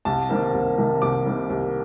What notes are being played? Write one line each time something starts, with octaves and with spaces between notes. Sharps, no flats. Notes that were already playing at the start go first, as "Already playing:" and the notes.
C2 A5
C3 D#3 G3 A#3
C2
C3 D#3 G3 A#3
C2 D6
C3 D#3 G3 A#3
C2